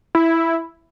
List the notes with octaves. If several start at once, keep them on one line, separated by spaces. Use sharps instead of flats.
E4